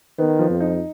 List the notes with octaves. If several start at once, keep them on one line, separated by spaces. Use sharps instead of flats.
D#3 B3
F3
F2
D#4